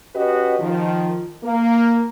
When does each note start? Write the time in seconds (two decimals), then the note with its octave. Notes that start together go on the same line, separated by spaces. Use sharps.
0.15 C#4 F#4 G4 B4 D#5
0.59 D#3 F3
1.44 A#3